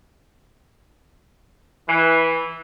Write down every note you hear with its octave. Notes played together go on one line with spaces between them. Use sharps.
E3